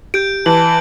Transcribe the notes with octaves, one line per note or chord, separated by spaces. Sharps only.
G4 G6 D7
E3 A5 F#7